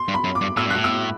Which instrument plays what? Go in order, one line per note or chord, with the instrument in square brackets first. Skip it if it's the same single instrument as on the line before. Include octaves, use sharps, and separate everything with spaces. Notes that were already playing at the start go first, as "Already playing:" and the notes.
Already playing: [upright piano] C6
[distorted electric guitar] G2
[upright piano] B5
[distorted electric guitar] F#2
[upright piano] D6
[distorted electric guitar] G2
[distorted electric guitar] A2 [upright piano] E6
[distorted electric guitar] G2
[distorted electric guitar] A2 [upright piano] F#6
[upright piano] E6